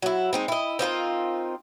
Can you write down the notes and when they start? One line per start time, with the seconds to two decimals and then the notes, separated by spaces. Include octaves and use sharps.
0.02 F#3 E4
0.33 G#3 C4 D#4
0.48 E4 D#5
0.79 C4 D#4 F4 A#4